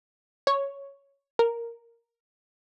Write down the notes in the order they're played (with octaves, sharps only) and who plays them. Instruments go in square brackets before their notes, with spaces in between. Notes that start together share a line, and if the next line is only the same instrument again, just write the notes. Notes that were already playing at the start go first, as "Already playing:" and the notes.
[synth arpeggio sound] C#5
A#4